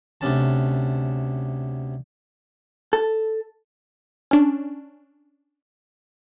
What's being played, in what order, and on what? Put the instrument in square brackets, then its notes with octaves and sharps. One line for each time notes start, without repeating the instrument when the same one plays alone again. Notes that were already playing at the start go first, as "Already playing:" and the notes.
[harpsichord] D2 C3 C#4 A5
[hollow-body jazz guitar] A4
[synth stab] C#4 D4